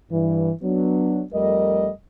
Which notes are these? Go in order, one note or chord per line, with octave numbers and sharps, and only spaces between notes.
G2 E3
F#3 B3 D4
F2 G3 A3 A#4 D#5